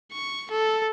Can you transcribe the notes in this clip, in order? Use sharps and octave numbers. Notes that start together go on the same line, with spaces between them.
C#6
A4